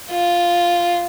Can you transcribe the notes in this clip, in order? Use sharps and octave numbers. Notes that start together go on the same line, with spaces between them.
F4